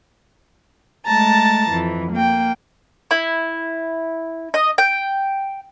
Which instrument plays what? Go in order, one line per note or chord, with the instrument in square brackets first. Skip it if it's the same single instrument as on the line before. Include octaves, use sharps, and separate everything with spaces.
[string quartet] G#3 A3 A5 A#5 A6
F2 E3
A#3 G5
[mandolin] E4
D#5
G5